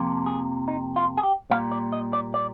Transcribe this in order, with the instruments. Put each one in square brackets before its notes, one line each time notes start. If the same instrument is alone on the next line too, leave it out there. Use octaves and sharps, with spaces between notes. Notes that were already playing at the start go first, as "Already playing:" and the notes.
Already playing: [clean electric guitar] F2 C3 F3 A#3
G#4
D#4
F4
G#4
G4
A#2 G3 A#3 F5
D5
D#5
D5
D5